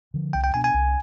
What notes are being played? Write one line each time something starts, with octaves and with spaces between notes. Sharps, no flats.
D3 F3
C2 G5
G5
B2 B3 D4 G#5
G#5
C2